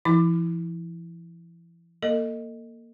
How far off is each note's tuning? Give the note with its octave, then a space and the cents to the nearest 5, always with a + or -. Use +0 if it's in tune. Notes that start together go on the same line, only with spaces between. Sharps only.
E3 +45 E4 -15 D6 +20
A#3 +0 A4 +35 D#5 +0